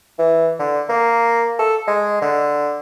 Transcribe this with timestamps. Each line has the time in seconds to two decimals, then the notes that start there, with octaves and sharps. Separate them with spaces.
0.19 E3
0.59 D3
0.89 A#3
1.59 A4
1.87 G#3
2.22 D3